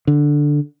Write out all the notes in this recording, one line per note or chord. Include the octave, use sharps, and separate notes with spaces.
D3